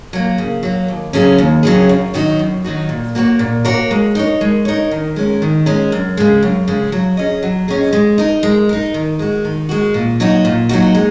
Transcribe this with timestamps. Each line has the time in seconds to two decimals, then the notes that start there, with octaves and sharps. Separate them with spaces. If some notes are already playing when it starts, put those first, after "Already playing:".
0.13 F#3 A#3
0.38 C#3
0.63 F#3 A#3
0.88 D#2
1.13 C#3 F#3 C#4 G#4
1.38 D#2
1.63 C#3 F#3 C#4 G#4
1.89 F#2
2.14 D#3 F#3 D#4 F#4
2.39 F#2
2.64 D#3 F#3 D#4 F#4
2.89 A#2
3.15 A#3 F#4 A#4 C#5
3.39 A#2
3.65 A#3 F#4 A#4 C#5
3.91 G#3
4.15 D#4 A#4 C#5
4.41 G#3
4.65 D#4 A#4 C#5
4.91 D#3
5.16 G#3 C#4 A#4
5.42 D#3
5.66 G#3 C#4 A#4
5.92 F#2
6.17 C#3 G#3
6.43 F#2
6.68 C#3 G#3
6.92 F#3
7.17 C#4 G#4 D#5
7.43 F#3
7.68 C#4 G#4 D#5
7.93 G#3
8.18 D#4 A#4
8.43 G#3
8.69 D#4 A#4
8.94 D#3
9.19 G#3 F#4
9.45 D#3
9.69 G#3 F#4
9.94 A#2
10.20 F#3 D#4 F#4
10.45 A#2
10.69 F#3 D#4 F#4
10.95 G#3